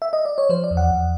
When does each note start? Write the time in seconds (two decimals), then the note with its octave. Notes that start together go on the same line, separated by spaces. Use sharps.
0.02 E5
0.13 D#5
0.25 D5
0.38 C#5
0.49 F3 C5
0.64 D5
0.71 E2
0.77 F#5
0.91 E2